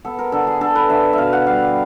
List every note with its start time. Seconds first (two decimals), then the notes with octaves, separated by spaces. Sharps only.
0.05 B3 A4
0.19 A#4
0.32 D3 A4
0.47 G#4
0.61 D3 A4
0.75 B4
0.89 D3 E5
1.13 E5
1.18 B2 F5
1.33 F#5
1.46 G3 F5